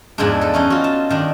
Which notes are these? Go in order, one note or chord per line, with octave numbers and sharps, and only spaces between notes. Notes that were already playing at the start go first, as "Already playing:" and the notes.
E2 G#2 E3 F3 G#3 D4
A4 B4
E3 C#4 D#4
F4 F#4
A5
A2 D#3 D4